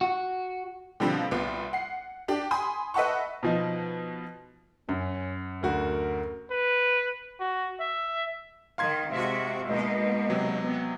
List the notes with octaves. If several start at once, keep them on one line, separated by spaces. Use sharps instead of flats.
F#4
B2 D3 F3 G3 A#3 C4
C2 A#2 B3
F#5 C7
D4 G4
G#5 B5 C6 D#6
B4 D#5 E5 F#5 A5 C#6
B2 F3 D#4
F#2 C#4
D2 F#4 A#4
B4
F#4
E5
D#3 F5 C6 G#6
C3 G#3 F#4 E5
B2 G#3 A#3 D#4 D#5
C3 F#3
B3